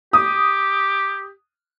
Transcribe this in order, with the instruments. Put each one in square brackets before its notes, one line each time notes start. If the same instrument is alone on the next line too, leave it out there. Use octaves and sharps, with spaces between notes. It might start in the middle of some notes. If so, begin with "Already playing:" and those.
[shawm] G4 [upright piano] D#6